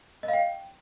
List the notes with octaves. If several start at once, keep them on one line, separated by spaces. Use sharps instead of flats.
D#5
F5
G5